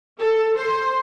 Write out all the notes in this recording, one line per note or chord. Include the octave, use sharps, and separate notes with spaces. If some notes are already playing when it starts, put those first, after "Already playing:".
A4
C5